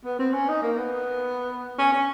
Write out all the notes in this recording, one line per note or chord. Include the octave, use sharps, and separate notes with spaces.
B3
C4
C#4
D#4
A#3
B3
C#4
C#4